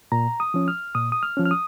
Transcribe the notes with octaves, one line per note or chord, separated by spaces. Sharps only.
A#2 A#5
D#6
F3 C#4
F6
A#2 D#6
D#6
F6
F3 C#4
F6
D#6